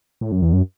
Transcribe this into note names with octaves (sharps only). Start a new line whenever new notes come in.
A2
F#2
E2
F#2